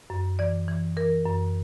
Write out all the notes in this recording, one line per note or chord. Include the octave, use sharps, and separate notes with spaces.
F#2
E3 D5
E3
E3 A#4
F#2